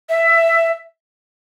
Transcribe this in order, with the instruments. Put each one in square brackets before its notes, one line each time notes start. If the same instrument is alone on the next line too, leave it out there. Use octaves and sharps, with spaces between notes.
[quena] E5